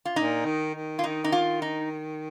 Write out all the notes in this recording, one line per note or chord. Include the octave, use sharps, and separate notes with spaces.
F4
A#2 D#4
D#3
D#3
F4
D#3 D#4
D#4
F4
D#4